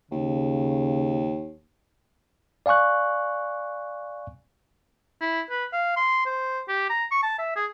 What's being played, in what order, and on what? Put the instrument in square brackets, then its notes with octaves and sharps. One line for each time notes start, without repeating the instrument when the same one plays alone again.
[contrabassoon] D#2 [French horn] C#3
[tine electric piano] D5 F5 G#5 C#6 F#6
[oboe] E4
B4
F5
C6
C5
G4
A#5
C#6
A5
E5
G#4